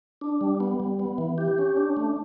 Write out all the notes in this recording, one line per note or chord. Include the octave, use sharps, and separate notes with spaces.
D4
G3
B3
G3
B3
E3
G4
C#4
D4
A3